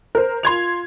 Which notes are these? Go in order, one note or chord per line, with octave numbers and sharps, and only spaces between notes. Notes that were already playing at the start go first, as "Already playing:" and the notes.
A#4 C5
F4 C6 G#6 F7